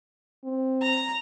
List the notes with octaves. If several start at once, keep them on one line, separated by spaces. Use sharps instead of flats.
C4
A#5